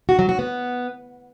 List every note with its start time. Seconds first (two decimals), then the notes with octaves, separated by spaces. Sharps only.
0.09 F#4
0.19 F#3
0.29 F#4
0.39 B3